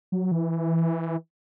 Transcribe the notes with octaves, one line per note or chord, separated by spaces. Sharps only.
F#3
E3